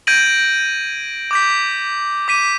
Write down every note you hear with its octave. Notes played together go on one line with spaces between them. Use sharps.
G6 G#6 A#6 D7 D#7 F#7
D6 G6 B6
D6 B6 D#7